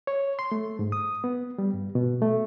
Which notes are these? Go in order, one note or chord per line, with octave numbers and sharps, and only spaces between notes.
C#5
C6
A3
G#2
D#6
B3
G3
G2
B2
A3